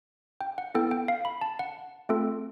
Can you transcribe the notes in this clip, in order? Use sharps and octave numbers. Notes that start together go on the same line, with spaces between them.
G5
F#5
B3 E4 A4 G5
G5
F5
B5
A5
F#5
A3 C4 F4 A4